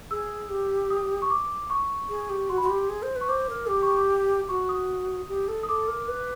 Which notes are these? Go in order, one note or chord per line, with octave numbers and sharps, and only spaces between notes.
G#4 E6
G4
D#6
C#6
D6
C#6
G#4
G4
F#4 C6
B5
F#4
G4 C6
G#4
C5
B4
C#6
C5 D6
A#4
G4 D6
C#6
D6
F#4 C#6
D#6
G4
A4
D#6
A4 D6
A#4
B4